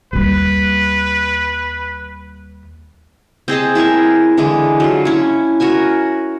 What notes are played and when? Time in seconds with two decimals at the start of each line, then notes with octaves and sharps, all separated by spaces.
0.13 D#2 G3 B4
3.48 C4 G#4 D#5 A5
3.75 E4 G#4 A#4 E5
4.37 D3 E3 G#3 E4
4.80 F#3 F4
5.05 C#4 E4
5.60 F#4 A#4 E5 G#5